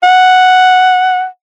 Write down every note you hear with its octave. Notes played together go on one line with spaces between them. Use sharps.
F#5